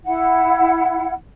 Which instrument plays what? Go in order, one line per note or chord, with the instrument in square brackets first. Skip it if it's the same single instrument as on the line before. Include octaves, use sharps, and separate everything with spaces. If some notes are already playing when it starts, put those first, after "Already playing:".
[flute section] E4 F#5